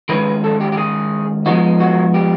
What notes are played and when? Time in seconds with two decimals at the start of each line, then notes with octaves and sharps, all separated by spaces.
0.09 D#3 G#3 C#4 B4
0.44 A4
0.61 G4
0.72 G4
0.77 G#4
1.46 F3 G#3 B3 D#4 F#4
1.80 F#4
2.14 G4